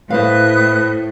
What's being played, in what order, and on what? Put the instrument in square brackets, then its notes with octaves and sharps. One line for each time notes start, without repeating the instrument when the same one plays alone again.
[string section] A2 [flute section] B4 D#6 F#6 [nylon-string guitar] C5 F5